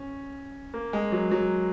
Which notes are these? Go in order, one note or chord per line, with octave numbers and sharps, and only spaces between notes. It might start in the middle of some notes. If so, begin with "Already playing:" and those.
Already playing: C#4
A#3
G#3
F#3
F#3